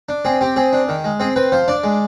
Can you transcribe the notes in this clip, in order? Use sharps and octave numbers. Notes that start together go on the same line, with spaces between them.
D4
C4 G#4
C4 G4
C4 G#4
D4
D#3
G#3
C4 G#4
C4 B4
F3 C5
D4 D5
G#3